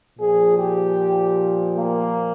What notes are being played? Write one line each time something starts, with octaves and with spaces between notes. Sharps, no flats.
A#2 F3 G#4
G4
A#3